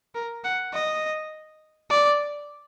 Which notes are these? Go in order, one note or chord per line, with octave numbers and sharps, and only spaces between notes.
A#4
F#5
D#5
D5